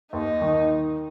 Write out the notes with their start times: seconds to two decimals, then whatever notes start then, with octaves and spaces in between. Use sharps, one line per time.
0.13 D#2 D#4
0.41 D#3